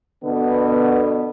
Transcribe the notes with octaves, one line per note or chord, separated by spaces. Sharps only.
B2 D3 B3